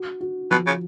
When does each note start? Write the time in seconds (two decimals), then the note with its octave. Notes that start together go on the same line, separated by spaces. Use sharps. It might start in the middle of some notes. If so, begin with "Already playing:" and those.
Already playing: F#4
0.21 F#4
0.51 B2 F3
0.67 C#3